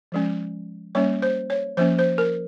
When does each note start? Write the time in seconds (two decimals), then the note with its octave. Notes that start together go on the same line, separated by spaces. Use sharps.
0.12 F3 G#3 C#4
0.95 G3 A#3 C#4 C#5
1.22 C5
1.50 C#5
1.77 F3 A#3 C#4 C5
1.99 C5
2.18 A#4